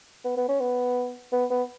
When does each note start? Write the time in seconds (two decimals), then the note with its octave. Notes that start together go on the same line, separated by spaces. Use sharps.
0.25 B3
0.37 B3
0.49 C#4
0.61 B3
1.33 B3
1.50 B3